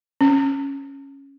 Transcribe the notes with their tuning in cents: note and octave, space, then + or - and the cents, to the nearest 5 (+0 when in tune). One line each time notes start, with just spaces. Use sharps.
C#4 -5